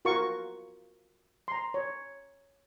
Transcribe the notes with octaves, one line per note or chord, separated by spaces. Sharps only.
F4 F#4 A#4 F5 C#6
A#5 C6
C#5